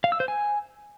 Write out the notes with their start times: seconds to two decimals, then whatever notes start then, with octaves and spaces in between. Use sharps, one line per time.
0.04 F5
0.12 E6
0.20 C5
0.28 G#5